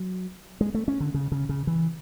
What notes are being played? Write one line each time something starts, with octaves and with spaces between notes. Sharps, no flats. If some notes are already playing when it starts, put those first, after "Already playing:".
Already playing: F#3
G#3
A3
C#4
D3
C#3
C#3
C#3
E3